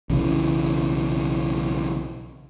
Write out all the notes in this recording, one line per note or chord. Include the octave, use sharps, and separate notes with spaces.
B1 C#3 E3